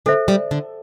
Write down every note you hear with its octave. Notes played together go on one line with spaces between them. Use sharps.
D3 A4 C5 E5
G3
D3